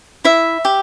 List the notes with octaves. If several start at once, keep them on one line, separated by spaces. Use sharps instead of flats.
E4 E5
G4